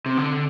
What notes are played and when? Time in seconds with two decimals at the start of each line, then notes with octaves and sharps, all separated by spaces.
0.06 C3
0.17 D3